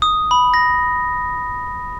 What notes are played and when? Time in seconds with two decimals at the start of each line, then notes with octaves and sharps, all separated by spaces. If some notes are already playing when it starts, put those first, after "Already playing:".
0.02 D#6
0.31 B5
0.54 A#6